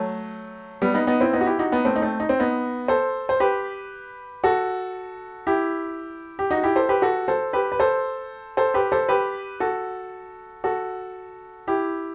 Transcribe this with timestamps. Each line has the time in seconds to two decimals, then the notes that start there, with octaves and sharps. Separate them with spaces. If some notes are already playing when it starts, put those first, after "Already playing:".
Already playing: F#3 A3
0.82 G3 B3
0.94 B3 D#4
1.07 B3 D#4
1.20 C4 E4
1.33 B3 D#4
1.41 F#4
1.47 E4 G4
1.59 D#4 F#4
1.72 B3 D#4
1.85 A3 C4
1.96 D#4
2.02 A3 C4
2.20 D#4
2.29 C4
2.39 B3 D#4
2.88 A4 C5
3.29 C5
3.40 G4 B4
4.44 F#4 A4
5.47 E4 G4
6.39 G4
6.51 D#4 F#4
6.63 E4 G4
6.76 A4 C5
6.89 G4 B4
7.02 F#4 A4
7.28 A4 C5
7.53 G4 B4
7.72 B4
7.79 A4 C5
8.57 A4 C5
8.74 G4 B4
8.92 A4 C5
9.09 G4 B4
9.60 F#4 A4
10.64 F#4 A4
11.67 E4 G4